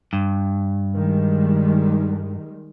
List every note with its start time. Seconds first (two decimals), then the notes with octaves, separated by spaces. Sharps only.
0.13 G2
0.95 D#3 G3 G#3